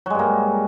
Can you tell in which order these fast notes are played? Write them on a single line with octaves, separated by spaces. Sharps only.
F#3 G#3 G2 A#3